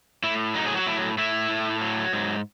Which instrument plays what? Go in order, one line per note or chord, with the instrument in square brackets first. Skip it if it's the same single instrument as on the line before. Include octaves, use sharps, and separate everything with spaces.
[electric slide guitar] A2 E4
F#3 D#4
G#4
F#4
A2 E4
A2 E4
A2
F#3
G#2